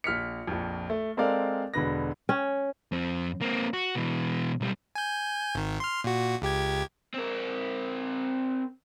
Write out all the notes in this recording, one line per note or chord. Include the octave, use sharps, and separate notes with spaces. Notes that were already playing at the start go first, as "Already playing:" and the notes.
A#1 F6 B6 C#7
A#1 F2
A3
G#3 C4 A4 A#4 D5 F5
E1 B2 D3 B4 A#6
C#4
F2 C4
A#3 C4
F#4
B2 E3
B1 G3
G#5 G6
G#1 D#3
C6 F6
A#2 F#4
C#2 G4 G#6
C4 A#4